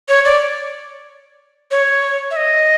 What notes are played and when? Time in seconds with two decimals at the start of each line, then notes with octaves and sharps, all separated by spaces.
0.09 C#5
0.25 D5
1.71 C#5
2.31 E5
2.36 D#5